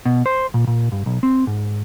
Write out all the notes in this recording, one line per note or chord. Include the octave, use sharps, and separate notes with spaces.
B2
C5
A#2
A#2
G2
B1
C4
G#2